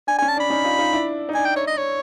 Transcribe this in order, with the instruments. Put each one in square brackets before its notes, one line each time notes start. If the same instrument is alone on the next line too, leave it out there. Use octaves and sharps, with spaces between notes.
[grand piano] D4 [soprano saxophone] G#5
[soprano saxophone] G#5
[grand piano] C#4
[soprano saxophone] A5
[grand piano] D4 [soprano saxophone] B5
[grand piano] C#4 D#4
D#4 F4
D#4 F4
D4 E4
D#4
[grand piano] D4 [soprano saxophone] G#5
[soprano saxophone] G5
C#5
D#5
C#5